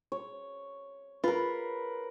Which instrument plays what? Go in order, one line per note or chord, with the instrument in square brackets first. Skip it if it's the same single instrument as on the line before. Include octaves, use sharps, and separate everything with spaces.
[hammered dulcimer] C#5
[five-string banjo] F4 [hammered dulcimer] A#4 B4